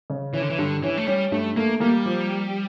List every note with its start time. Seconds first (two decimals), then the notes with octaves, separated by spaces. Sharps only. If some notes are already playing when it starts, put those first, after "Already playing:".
0.10 C#3
0.34 E3 C#4
0.42 D3
0.50 E3
0.58 G2 D3
0.83 E3 C#4
0.97 A3
1.07 G3 C#4
1.32 G2 A3
1.56 A3 A#3
1.80 G3 A#3
2.06 F3